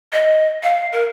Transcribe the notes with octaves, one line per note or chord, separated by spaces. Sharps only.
D#5
F5
A#4